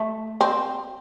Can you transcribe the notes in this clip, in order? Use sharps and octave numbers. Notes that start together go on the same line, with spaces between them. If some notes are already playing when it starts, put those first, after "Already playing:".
Already playing: A3
C4